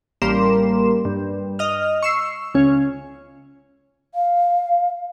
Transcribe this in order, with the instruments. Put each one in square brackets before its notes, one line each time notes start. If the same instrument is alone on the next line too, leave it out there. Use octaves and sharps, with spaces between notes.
[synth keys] A1 G3 A#3 A#4 C6 E7
G2
D#5 F6
C#6 E6 C7
C#2 C#4
[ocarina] F5